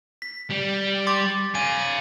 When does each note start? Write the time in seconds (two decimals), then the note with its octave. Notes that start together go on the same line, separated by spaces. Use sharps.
0.22 B6
0.50 G3
1.07 C6 D6 A6
1.55 F5 G#5 D#7